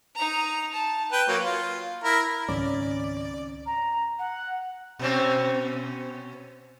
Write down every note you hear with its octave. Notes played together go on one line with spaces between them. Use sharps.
D#4 A#5
A5
B4 G5
F#3 A#3
F4
E4 A#4
C#2 G#2 D#3 G#3 C4 C#4 D5 D6
A#5
F#5
B2 C4 C#4